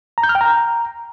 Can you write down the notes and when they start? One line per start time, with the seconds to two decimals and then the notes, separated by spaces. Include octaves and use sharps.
0.18 A#5
0.23 G6
0.29 F6
0.35 G5
0.41 A#5